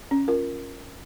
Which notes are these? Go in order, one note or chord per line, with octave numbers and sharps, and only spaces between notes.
C#4
F4 A#4